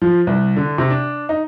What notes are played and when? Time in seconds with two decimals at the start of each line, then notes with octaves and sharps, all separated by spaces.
0.02 F3
0.27 C2
0.56 D3
0.78 C3
0.90 D4
1.29 D#4